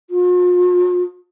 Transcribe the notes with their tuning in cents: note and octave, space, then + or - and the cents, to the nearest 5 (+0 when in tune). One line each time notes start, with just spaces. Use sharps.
F4 +45